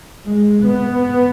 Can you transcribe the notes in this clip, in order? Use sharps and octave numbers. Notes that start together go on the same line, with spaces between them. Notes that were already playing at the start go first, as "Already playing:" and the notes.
G#3
B3